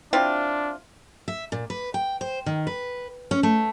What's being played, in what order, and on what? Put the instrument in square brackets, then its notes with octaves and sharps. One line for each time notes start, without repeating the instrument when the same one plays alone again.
[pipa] C4 E4 F4 [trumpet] D4
[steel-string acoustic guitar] E5
A#2
B4
G5
C5
D#3
B4
C#4
A3